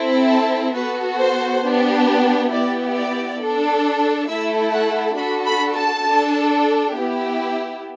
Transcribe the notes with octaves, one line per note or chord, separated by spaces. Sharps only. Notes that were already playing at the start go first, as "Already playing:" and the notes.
Already playing: C4 E4 A4
A5
B3 F#4 A4 B4
C5
B3 D4 G4
B3 E4 G4 D5
D5
D4 A4
A3 E4 A4 E5
F#5
D4 F#4 A4 B5
B5
A5
D4 A4
B3 E4 G4